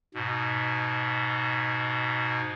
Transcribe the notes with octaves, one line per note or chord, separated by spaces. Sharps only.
G#2 B2